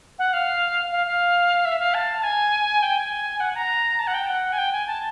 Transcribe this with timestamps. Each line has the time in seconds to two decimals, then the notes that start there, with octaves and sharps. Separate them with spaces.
0.18 F#5
0.33 F5
0.92 F5
1.06 F5
1.65 E5
1.79 F5
1.94 A5
2.19 A5
2.23 G#5
2.82 G5
2.97 G#5
3.40 F#5
3.55 A#5
3.99 A5
4.07 F#5
4.14 G5
4.28 F#5
4.52 G#5
4.58 G5
4.72 G#5
4.87 A5